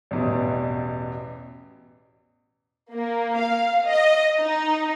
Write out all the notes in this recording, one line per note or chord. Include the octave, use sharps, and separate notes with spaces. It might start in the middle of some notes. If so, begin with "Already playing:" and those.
A1 E2 B2
A#3
F5
D#5
D#4